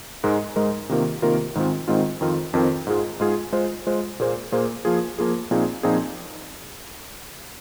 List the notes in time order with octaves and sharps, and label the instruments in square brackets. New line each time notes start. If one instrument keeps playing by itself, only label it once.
[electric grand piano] G#2 G#3 D#4 A#4
G#2 G#3 D#4 A#4
C3 D#3 A#3 F4 A#4
C3 D#3 A#3 F4 A#4
G#2 D#3 G#3 C4 F4
G#2 D#3 G#3 C4 F4
F2 D#3 C4 F4 A#4
F2 D#3 C4 F4 A#4
G#2 G#3 F4 G#4
G#2 G#3 F4 G#4
G#3 F4 C5
G#3 F4 C5
A#2 A#3 G#4 C5
A#2 A#3 G#4 C5
F3 A#3 F4 G#4
F3 A#3 F4 G#4
A#2 F3 C4 D#4 G#4
A#2 F3 C4 D#4 G#4